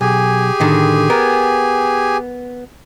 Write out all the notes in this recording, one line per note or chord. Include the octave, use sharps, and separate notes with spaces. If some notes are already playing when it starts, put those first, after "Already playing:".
B1 G4 G#4 G#5
A2 D3 D#3
B3 A#4